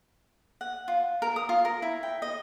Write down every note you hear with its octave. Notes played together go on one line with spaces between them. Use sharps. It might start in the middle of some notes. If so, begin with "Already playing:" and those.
F#5
F4
A#4
D#6
F4
A#4
E4
G5
D#5